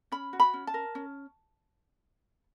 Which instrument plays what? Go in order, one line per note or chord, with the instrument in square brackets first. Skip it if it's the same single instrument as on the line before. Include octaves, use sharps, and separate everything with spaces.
[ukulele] C#4 B5
F#4
B5
C#4
A5
A#4
C#4